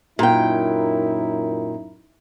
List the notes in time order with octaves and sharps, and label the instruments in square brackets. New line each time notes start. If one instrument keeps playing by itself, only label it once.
[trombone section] F#2 D#4 E4 [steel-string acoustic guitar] A#2 G5